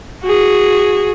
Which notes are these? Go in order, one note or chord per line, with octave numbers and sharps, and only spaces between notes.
F#4 G#4